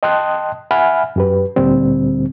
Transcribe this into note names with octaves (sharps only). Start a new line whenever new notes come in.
D#5 G5 A5 C6 D#6 F#6
E5 F#5 G#5 B5 F6
F#2 G4 B4
D2 A#2 D3 G3 C4